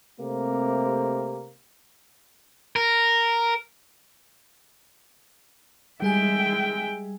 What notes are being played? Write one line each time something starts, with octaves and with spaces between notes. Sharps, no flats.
C3 A3 A#3 C4 G4
A#4
G3 G#3 G#4 E5 G5 G#5